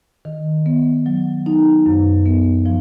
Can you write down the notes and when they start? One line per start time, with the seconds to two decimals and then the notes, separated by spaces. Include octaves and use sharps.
0.25 D#3
0.66 B3
1.06 F#3
1.46 D#4
1.86 F#2
2.26 B3
2.66 F3